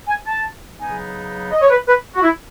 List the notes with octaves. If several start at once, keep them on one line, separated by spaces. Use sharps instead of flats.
G#5
A5
C#3 F#3 B3 D#4 G#5
D#5
C#5
B4
B4
F#4
E4